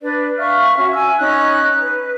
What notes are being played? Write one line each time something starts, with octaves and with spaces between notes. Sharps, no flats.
D4 B4 D5
E5 F5 C#6 F6
C#4 F#4 E5
G#5 E6
C#4 D#4 F#6
B4